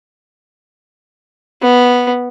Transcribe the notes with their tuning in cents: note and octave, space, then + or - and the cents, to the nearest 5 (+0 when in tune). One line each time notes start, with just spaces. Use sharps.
B3 -5